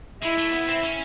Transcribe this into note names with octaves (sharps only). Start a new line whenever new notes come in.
G#3 E4
A3
B3
C4
C#4